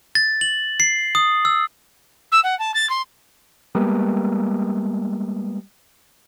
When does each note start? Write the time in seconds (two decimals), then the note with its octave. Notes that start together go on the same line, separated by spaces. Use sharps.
0.15 A6
0.41 F#7
0.80 C7
1.15 D#6
1.45 E6
2.32 E6
2.44 F#5
2.59 A5
2.74 A6
2.90 C6
3.75 G3 G#3 A#3 B3